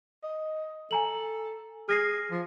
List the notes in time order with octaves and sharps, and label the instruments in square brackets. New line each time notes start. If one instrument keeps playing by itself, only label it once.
[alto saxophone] D#5
[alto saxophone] A4 [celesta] G#5 A#5 F#7
[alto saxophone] G#4 [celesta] F6 A#6 C7
[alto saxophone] F3